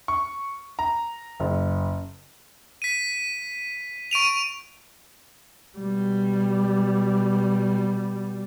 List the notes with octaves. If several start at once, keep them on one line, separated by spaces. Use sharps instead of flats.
C#6
A#5
F#1
B6 D#7
C#6 D7 D#7 F7
B2 G3